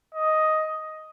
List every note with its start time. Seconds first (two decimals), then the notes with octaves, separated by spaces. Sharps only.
0.15 D#5